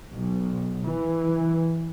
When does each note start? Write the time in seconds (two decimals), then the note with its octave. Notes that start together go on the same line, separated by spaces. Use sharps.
0.13 B1
0.86 E3